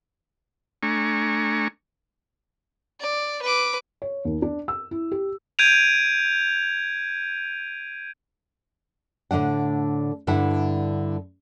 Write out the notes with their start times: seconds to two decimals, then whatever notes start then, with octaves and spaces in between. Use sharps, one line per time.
0.83 A3 D4 G#5 A#5 C#6
3.00 D5
3.42 B4 D6
4.02 C#5
4.25 D#2
4.42 D4
4.68 E6
4.91 E4
5.12 G4
5.59 G6 G#6 D7 D#7 F7
9.31 A2 D3 A3 D4 F#5
10.27 G2 D3 E4 E5 F#5